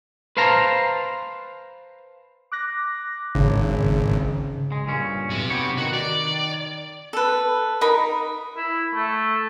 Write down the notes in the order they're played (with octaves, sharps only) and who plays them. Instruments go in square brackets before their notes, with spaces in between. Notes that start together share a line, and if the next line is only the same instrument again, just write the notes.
[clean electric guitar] B4 C5 F5 A5 A#5
[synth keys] D6 F#6 A#6
[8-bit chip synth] G#1 [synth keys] C#3
[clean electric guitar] G#3
G2 A#2 C#4
[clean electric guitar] B1 [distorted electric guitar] C3
[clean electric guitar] B3 G4 C#5
[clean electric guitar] D#3 [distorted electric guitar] F#4
[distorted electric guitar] D5
[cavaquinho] A4 B4
D#4 A#4 B5
[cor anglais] E4
A3